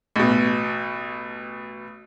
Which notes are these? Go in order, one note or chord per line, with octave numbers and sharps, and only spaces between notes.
A1 B2